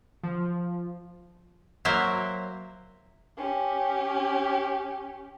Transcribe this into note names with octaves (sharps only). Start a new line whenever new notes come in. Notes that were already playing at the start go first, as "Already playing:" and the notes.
F3
F#3 A#3 C5 E5
C#4 G4